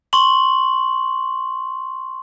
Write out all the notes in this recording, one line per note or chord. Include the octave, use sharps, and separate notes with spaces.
C6 C#6 F#7